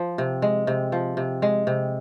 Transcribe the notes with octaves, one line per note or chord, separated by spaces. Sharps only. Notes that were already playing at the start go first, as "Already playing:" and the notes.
Already playing: F3
C3
G#3
C3
F3
C3
G#3
C3